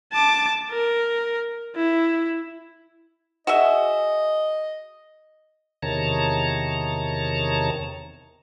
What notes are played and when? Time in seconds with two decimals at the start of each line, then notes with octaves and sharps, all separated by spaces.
0.12 A5 D6
0.71 A#4
1.75 E4
3.47 F#4 G#4 D#5 E5
5.82 E2 C3 D#3 C#5 A5 A#5